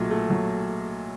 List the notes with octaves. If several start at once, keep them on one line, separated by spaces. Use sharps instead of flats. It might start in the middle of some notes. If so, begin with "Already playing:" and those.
Already playing: B1 A#2 F#3 A3
A3
F#3